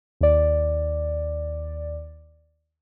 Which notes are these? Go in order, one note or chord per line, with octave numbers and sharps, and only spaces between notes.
D#2 D5